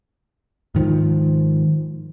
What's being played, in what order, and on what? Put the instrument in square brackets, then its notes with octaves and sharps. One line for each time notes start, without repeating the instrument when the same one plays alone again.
[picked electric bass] G#2 D#3 F3